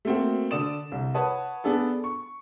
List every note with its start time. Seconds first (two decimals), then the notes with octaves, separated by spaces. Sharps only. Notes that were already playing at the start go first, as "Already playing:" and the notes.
0.05 A3 A#3 C4 F#4
0.51 D3 A4 D5 D#6 E7
0.92 C2
1.14 B4 C#5 F#5 A5 D#6
1.64 B3 D4 G#4 A4
2.04 C#6